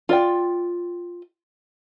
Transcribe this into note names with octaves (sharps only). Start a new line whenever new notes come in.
F4 D5 G5